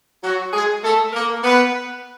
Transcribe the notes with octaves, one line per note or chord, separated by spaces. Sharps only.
F#3 F#4
G#3 G#4
A3 A4
A#3 A#4
B3 B4